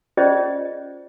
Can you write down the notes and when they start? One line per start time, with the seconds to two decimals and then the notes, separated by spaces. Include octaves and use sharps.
0.17 C#4 F4 G#4 C5 D5 D#5